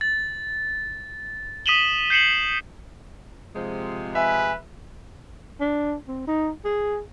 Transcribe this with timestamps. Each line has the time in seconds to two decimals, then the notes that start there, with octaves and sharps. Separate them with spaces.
0.01 A6
1.66 D#6 B6 D#7 E7 F#7 G7
2.10 G6 C7 C#7 E7 F#7
3.56 C3 F3 G#3
4.15 B4 E5 G#5
5.61 D4
6.08 C4
6.27 D#4
6.65 G#4